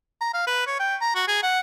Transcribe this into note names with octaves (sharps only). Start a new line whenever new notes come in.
A#5
F5
B4
C#5
G5
A#5
F#4
G#4
F#5